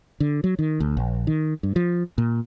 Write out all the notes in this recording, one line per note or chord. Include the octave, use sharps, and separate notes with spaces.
D3
F#3
D#3
D2
A#1
D#3
G2
F3
A#2